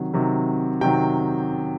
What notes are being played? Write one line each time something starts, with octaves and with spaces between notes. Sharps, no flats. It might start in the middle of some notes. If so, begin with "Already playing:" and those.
Already playing: C3 D#3 F#3
C3 D#3 F#3
C3 D#3 F#3 G5